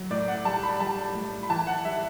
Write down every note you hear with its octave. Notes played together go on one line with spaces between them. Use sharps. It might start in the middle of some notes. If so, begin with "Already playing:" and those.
Already playing: F#3
A2 D5
F#5
G3 A5
B5
G3 A5
A2
B5
E3 A5
F#5
G3 E5